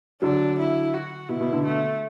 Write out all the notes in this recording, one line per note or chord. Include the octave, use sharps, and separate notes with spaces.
D3 F#3 D4
E4
F#4
B2 E4
B2
B2 D3
A3